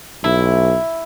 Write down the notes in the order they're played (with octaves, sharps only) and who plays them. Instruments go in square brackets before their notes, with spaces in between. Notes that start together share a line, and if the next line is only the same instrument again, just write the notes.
[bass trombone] B1 [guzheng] E4